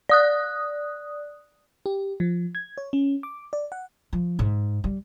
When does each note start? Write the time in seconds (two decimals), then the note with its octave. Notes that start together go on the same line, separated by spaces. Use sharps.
0.09 D5 D#6 F#6
1.86 G4
2.20 F3
2.55 G#6
2.78 C#5
2.93 C#4
3.23 D6
3.53 D5
3.72 F#5
4.13 F3
4.39 G#2
4.84 G3